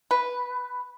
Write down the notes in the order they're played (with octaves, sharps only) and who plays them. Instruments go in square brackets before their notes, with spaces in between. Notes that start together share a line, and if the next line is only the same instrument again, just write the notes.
[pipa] B4